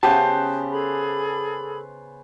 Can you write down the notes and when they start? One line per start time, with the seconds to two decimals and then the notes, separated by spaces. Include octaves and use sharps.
0.03 C#3 B3 G4 C5 A5
0.71 G#4 A4 B5